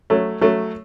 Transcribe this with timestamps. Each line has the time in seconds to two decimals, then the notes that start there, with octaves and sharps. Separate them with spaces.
0.10 F#3 A3
0.41 F#3 A3